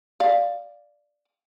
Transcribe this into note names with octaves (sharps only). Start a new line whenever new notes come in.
D5 F5